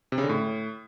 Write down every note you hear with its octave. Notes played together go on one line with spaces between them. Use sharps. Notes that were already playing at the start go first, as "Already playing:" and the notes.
C3
C#3
D3
A2